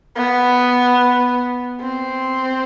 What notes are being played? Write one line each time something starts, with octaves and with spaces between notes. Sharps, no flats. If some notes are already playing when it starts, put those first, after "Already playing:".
B3
C4